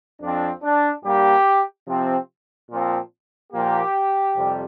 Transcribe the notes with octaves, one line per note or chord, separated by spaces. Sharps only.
F2 F3 C4 D4
D4
G2 G3 A#3 G4
C3 F3 C4
A#2 F3 C4
A#2 F3 A#3 G4
F2 C3 G3